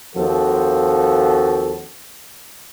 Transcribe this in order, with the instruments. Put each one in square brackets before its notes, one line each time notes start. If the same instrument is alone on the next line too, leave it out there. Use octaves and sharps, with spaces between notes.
[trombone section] D#2 F3 C4 F#4 A4